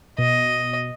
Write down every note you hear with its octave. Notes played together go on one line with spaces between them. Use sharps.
B2 D#5